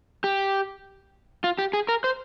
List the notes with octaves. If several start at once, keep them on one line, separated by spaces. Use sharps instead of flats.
G4
F4
G4
G#4
A#4
C5